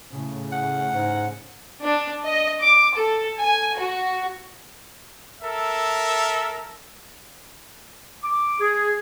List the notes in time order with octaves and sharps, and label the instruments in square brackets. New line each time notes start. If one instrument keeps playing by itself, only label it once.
[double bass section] A2 C#3
[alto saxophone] F#5
[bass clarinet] G#2
[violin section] D4
D#5
D6
A4
G#5
F#4
[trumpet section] A4 A#4 E5
[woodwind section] D6
G#4